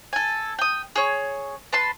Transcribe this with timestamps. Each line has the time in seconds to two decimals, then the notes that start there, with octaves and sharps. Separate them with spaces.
0.13 A4 G#5
0.59 G5 D#6
0.96 G#4 C#5
1.73 B4 A5 C6